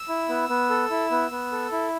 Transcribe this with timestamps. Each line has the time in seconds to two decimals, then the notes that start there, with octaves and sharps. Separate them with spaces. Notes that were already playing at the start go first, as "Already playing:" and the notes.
Already playing: E6
0.09 E4
0.29 B3
0.49 B3
0.70 A4
0.91 E4
1.11 B3
1.31 B3
1.52 A4
1.72 E4